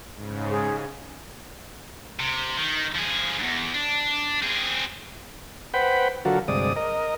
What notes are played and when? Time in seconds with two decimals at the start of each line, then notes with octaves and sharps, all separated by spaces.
0.15 G#2 C#3
0.50 G#4
2.19 C3
2.58 D#3
2.95 F3 G#4
3.39 E2 G2
3.74 D4
4.42 C4 G#4
5.74 B4 C5 F#5 G5 B5
6.25 D3 F#3 F4 F#4 A4 A#4
6.48 D2 G2 C3 G#3 D5 D#6
6.76 A#4 D#5